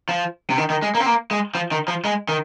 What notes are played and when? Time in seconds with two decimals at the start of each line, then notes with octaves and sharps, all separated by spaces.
0.09 F3
0.50 C3
0.58 D#3
0.70 D#3
0.82 G#3
0.95 A#3
1.00 C4
1.06 A#3
1.31 G#3
1.55 F3
1.71 D#3
1.88 F3
2.05 G#3
2.29 D#3